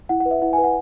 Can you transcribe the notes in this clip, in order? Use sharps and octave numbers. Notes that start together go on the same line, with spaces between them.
E4 F#5
F#5
B4
E5
E4 F#5
G#5
B4
F#5